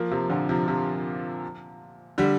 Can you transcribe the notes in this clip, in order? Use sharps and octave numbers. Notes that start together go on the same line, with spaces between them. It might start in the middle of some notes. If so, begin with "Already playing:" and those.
Already playing: F3 A#3
C3 F3
A#2 D3
C3 F3
C3 F3
D3 G3